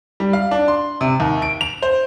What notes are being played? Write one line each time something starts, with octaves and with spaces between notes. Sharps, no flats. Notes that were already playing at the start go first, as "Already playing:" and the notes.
G3
F5
D4
C6
C3
D#2
D7
F7
C5